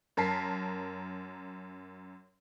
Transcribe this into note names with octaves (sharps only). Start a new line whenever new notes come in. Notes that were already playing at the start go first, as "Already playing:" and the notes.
F#2 A#4 A5 B6 C7